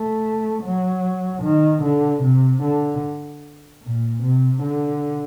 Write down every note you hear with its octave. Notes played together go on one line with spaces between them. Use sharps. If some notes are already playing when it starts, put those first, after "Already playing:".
Already playing: A3
F#3
D#3
D3
C3
D3
A#2
C3
D3